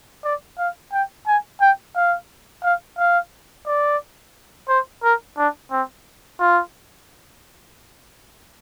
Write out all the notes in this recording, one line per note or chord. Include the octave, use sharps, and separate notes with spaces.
D5
F5
G5
G#5
G5
F5
F5
F5
D5
C5
A#4
D4
C4
F4